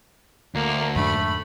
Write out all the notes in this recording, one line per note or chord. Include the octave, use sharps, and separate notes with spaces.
D2 A#3
F2 G#2 A3 D4 B5